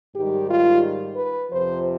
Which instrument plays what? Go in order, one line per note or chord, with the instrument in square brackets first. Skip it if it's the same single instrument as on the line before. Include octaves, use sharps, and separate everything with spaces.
[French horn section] G#2 D#3 G3 G4
F4
B4
F2 C3 F3 C5